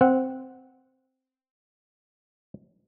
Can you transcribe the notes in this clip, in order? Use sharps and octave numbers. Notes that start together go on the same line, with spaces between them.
C4 F#5